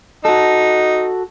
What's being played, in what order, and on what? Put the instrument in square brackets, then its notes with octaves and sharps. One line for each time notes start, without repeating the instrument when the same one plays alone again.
[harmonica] D#4 [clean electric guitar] F#4 A4